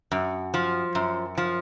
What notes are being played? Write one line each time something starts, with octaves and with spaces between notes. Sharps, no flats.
F#2
F3
F#2
F3